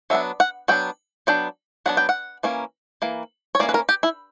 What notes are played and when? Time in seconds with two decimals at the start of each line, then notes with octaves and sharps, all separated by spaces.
0.10 F#3 B3 D4 E5
0.40 F#5
0.68 F#3 B3 D4 G5
1.27 F#3 B3 D4 G5
1.86 F#3 B3 D4 F#5
1.97 G5
2.09 F#5
2.43 E3 A#3 C#4
3.02 E3 A#3
3.55 C#5
3.59 E3 A#3 C#4 D5
3.69 B4
3.74 A#4
3.89 G4
4.03 E4